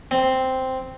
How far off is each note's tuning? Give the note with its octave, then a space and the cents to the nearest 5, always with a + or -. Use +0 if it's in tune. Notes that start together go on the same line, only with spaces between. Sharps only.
C4 -5